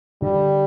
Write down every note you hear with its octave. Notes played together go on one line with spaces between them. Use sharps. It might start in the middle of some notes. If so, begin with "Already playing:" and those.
D3 G3